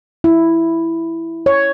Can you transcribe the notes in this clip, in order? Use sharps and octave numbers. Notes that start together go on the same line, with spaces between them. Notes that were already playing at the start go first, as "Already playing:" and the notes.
E4
C#5